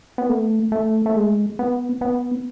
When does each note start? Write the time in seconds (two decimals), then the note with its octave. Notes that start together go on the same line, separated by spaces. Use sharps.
0.18 B3
0.29 A3
0.72 A3
1.06 A3
1.16 G#3
1.59 B3
2.01 B3